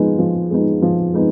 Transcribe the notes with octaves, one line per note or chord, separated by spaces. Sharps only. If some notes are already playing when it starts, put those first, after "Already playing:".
Already playing: F3 G#3 B3 D#4
F3
G#3 B3 D#4
F3
G#3 B3 D#4